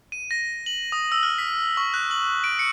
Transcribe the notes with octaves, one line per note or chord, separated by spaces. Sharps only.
D#7
A#6
F#7
D#6
E6
F6
B6
C#6
F#6
F#7
D7
C#7